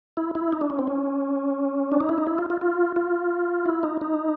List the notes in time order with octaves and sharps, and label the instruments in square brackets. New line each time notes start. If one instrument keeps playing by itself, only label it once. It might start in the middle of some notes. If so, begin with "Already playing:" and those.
[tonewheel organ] E4
E4
D#4
D4
C#4
C4
C#4
D4
D#4
E4
D#4
E4
F4
F4
F4
F4
E4
D#4
D#4